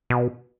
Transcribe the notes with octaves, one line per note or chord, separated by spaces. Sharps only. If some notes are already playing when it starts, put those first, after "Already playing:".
B2